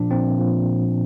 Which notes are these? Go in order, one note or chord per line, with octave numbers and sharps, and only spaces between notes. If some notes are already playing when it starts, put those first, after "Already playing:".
Already playing: A#2 F3 D4
A#2 F3 C4
A#2 F3